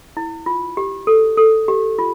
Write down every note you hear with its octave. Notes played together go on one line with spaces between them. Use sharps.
E4
F4
G4
A4
A4
G4
F4